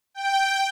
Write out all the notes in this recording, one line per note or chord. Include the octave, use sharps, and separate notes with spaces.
G5